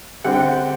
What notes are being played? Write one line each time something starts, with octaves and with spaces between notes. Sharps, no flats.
D3 G3 C4 F#5
G5
F#5